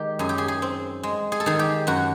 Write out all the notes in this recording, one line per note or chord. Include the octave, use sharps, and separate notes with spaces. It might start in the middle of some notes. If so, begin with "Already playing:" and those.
Already playing: D#3 G#3 G4
F#2 G#4
G4
G#4
G#4
C4
G#3
G#4
A4
D#3 G#4
G4
F#2 F#4